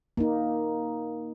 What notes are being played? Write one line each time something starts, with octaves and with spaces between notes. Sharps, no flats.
A#3 D#4